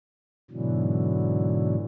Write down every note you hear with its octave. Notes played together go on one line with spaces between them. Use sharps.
G#2 B2 D3 E3 F#3